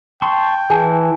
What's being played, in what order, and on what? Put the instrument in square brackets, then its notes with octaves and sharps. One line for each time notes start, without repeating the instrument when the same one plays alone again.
[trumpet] G5 [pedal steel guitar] A5 C6 C#6
[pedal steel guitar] E3 [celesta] G#4 G#5 A5